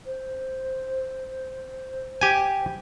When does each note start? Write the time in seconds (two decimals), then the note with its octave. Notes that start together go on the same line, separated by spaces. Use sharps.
0.06 C5
2.21 G4 G#5